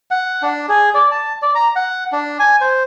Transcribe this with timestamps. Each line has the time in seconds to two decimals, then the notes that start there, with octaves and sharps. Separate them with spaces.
0.11 F#5
0.42 D4
0.69 G#4
0.95 D5
1.11 A5
1.42 D5
1.55 A#5
1.76 F#5
2.12 D4
2.39 G#5
2.61 C5